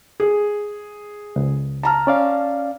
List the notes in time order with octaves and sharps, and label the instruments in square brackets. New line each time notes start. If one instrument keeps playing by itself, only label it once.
[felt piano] G#4
[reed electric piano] C#2
[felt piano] A5 A#5 F6
[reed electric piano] C#4 D5 F5